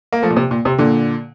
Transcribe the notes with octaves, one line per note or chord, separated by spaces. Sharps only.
A#3
F3 A3
A#2
C3
A#2
C3
A#2 D3